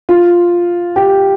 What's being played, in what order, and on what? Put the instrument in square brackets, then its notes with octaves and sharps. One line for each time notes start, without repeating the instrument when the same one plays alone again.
[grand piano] F4
G4